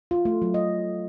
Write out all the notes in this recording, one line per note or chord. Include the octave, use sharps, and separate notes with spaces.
F4
A3
F#3
D#5